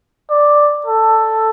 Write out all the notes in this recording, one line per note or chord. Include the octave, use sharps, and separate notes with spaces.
D5
A4